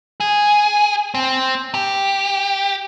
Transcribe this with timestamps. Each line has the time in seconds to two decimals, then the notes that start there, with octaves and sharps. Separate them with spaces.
0.20 G#4
1.14 C4
1.74 G4